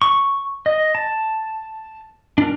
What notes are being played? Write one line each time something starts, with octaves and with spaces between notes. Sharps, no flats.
C#6
D#5
A5
D4 A#4